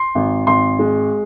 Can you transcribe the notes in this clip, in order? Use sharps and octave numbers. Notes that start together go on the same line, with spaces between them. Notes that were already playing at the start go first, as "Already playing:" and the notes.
Already playing: C6
G#1
G#1 C6
G#3